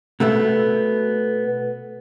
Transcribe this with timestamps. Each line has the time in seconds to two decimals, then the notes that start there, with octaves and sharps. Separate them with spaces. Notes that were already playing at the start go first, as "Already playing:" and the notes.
0.20 B2 A3 B3